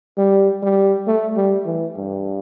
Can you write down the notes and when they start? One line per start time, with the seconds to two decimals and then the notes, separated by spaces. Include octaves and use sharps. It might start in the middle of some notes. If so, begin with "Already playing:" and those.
0.18 G3
0.63 G3
1.07 A3
1.36 G3
1.66 E3
1.96 G2